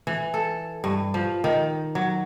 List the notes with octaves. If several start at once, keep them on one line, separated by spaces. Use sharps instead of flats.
E3
A4
G2
F3
D#3
F#3